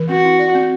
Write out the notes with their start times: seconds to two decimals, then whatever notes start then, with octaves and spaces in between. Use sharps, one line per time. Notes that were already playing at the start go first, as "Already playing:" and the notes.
Already playing: E3
0.09 C4 F#4
0.25 E4
0.39 D5
0.55 C4